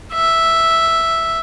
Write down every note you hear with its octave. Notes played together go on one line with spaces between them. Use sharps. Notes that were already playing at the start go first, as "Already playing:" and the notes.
E5